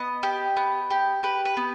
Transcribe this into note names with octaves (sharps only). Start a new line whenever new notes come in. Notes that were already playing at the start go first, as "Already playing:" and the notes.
Already playing: B3 D#5
G4
B3
G4
G4 B4
B4
B3